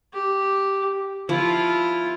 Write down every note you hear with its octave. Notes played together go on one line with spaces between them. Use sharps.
G4
F3 E4 F4